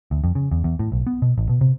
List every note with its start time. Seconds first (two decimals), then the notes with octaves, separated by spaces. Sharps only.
0.11 D2
0.24 F2
0.35 C#3
0.51 E2
0.64 E2
0.79 A2
0.92 B1
1.07 B3
1.22 B2
1.38 A1
1.49 B2
1.61 C3